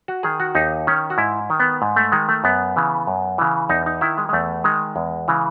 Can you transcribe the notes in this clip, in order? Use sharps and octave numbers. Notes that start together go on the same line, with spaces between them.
F#4
D#3 G#4
F#4
D#2 D#4
D#3 C#4
F#4
G#2 E4
D#3
B3
G#2
A3
D#3 G#3
A3
F#2 B3
C#3 E3
F#2
C#3 E3
E2 D#4
D#4
D#3 E4
G#3
G#3
E2 A3
D#3 G#3
E2
C#3 E3